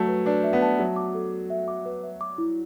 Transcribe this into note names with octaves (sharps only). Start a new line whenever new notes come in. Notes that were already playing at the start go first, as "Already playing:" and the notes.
Already playing: F#3 A3 A5
B4
D4 B4
E5
B3
A5
F#3 E5
D6
A4
A4
E5
D6
B4
E5
D6
E4